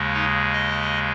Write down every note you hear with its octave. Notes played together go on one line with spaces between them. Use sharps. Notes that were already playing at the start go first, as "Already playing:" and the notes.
Already playing: D#2 C#3 G#3
D#4
D#5